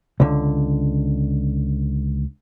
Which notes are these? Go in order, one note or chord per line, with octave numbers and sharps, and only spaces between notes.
C#2 D3